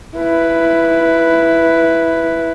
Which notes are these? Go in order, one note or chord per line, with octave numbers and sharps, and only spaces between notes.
E4 B4